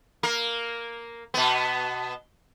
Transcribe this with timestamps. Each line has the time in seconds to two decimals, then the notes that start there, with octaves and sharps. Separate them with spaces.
0.23 A#3 A#4
1.34 B2 B3